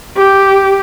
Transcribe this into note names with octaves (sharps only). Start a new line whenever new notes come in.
G4